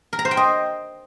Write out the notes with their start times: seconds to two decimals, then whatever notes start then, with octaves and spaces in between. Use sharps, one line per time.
0.13 A#4
0.19 A#5
0.25 C5
0.31 G5
0.37 D#5